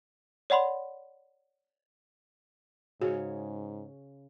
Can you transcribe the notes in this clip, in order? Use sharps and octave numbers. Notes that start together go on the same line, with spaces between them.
C#5 D5 F#5 B5 C6
G#2 C#3 F#4 C#5